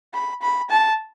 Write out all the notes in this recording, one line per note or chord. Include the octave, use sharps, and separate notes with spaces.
B5
B5
A5